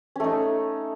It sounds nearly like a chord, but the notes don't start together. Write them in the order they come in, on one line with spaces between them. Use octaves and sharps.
C#4 A3 D#4